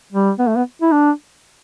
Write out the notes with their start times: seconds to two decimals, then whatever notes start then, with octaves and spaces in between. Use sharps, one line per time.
0.13 G3
0.39 B3
0.48 A3
0.56 B3
0.82 E4
0.92 D4